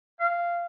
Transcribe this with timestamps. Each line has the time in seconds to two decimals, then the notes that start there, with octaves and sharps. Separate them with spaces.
0.20 F5